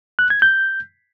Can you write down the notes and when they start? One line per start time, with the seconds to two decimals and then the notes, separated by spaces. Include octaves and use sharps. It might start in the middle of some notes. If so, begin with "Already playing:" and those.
0.19 F#6
0.30 G#6
0.42 G6